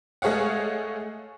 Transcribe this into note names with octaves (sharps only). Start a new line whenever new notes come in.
G#3 A3 G#4 C#5 F5 F#5